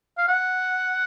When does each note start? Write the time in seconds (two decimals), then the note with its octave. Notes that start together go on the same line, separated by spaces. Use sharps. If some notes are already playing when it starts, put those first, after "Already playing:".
0.18 F5
0.28 F#5